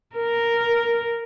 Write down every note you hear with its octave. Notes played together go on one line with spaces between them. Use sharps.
A#4